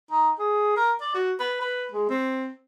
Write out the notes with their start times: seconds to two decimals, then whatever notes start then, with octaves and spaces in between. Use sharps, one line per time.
0.11 D#4
0.39 G#4
0.77 A#4
1.01 D5
1.15 F#4
1.40 B4
1.61 B4
1.92 G#3
2.10 C4